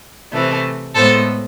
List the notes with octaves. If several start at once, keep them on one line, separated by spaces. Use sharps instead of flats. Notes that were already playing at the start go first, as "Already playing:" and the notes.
C3 E3 A3
A2 G#3 B3 A4 C5